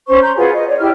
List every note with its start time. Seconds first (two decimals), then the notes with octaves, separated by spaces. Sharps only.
0.07 C#4 C5 C6 C#6
0.21 A#5 C6 G6
0.36 F4 F#4 G#4 B4
0.54 D#5
0.67 C#5 D5
0.79 E4 G4 F6